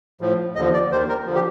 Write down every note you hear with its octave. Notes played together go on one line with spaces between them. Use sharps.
A2 F3
D#2 D3 F3 D#5
D5
D#2 D#3 C5
A#4
D3 F3
G4